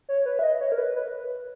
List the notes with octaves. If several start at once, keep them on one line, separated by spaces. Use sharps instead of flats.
C#5
B4
E5
D#5
C#5
A#4
B4
B4